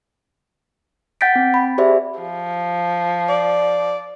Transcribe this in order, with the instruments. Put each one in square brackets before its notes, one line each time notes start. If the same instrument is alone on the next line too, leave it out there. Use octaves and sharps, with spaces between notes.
[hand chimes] F#5 G5 G6 A6 B6 D7
C4
B5
G4 G#4 C5 D5 E5
[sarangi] F3
[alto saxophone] D5